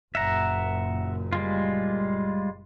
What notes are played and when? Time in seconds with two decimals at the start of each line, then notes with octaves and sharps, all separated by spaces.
0.15 F#1 A#2 E5 F#5 A#5
1.33 G3 G#3 F4